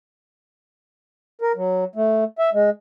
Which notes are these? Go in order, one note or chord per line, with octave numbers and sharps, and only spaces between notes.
A#4
F#3
A3
E5
G#3